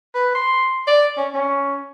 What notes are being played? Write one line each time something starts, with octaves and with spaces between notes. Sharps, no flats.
B4
C6
D5
C#4
C#4